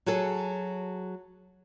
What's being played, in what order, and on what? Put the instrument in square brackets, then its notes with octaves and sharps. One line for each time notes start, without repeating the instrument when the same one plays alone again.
[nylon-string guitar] F#3 F#4 G#4 A4